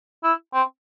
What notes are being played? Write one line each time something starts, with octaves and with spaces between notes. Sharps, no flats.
E4
C4